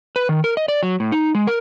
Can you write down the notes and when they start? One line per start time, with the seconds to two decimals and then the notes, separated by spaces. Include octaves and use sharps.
0.16 B4
0.29 D#3
0.44 A#4
0.57 D#5
0.68 D5
0.83 F#3
1.00 A2
1.12 D#4
1.35 G#3
1.47 A#4